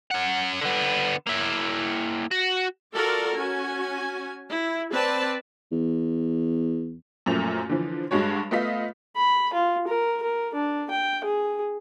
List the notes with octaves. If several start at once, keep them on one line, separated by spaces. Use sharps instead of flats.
C#4 F#5
D3 B3
A#3 E4
F#4
F4 F#4 A4 A#4 D5
C#4 F#4 G#5
E4
C4 B4 D5 A5
E2
F#2 A#2 F3 A3 F7
D3 E3 F3
G2 G#3 F#4 C#5
A3 B3 F4 D#5 F5 B6
B5
F4
A#4
A#4
D4
G5
G#4